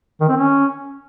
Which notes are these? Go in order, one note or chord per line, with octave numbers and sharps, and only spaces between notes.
D#3
C4
C#4